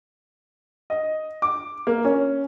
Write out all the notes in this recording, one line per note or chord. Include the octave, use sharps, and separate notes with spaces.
D#5
D6
A#3
C#4